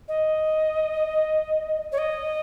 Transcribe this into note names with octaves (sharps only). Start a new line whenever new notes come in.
D#5
C#5
D#5